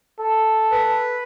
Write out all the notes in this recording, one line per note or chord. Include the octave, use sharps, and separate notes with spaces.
A4
B4